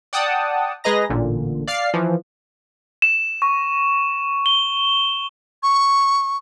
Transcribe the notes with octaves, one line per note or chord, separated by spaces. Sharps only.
D5 F#5 G5 A5 D#6
G#3 G#4 B4 D#5 A#5 A#6
A1 A#2 D3
D5 F5 F6 C7
E3 F3
E7
C#6
G7
C#6